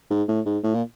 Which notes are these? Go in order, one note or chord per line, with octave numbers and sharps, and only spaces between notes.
G#2
A2
G#2
A2
A#2